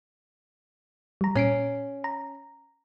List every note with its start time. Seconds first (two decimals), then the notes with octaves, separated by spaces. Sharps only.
1.21 G3 A#5
1.36 A#2 C#4 C7 D7
2.04 A#5